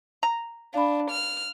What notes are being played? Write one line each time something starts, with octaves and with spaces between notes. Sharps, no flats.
A#5
D4 F5 B5
F6